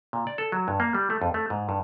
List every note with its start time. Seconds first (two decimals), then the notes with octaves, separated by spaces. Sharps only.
0.13 A#2
0.27 D5
0.38 A4
0.52 F#3
0.68 G2
0.80 A#3
0.95 G3
1.10 A3
1.22 F2
1.34 A3
1.50 G#2
1.69 G2